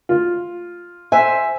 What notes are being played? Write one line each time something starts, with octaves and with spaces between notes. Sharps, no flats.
F4
C5 E5 G#5